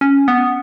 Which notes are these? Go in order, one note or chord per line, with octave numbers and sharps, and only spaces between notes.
C#4
B3